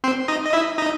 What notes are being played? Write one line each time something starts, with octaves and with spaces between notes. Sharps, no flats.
C4 C5
D#4 D#5
D#5
E4 E5
D#4 D#5